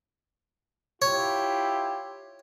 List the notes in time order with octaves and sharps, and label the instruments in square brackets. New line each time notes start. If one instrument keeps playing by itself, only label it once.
[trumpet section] E4 F4 G4 [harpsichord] C#5